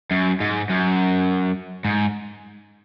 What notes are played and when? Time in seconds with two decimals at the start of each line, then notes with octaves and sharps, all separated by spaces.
0.11 F#2
0.40 G#2
0.69 F#2
1.85 G#2